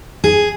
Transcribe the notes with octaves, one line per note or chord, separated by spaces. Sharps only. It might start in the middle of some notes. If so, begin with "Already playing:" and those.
G#4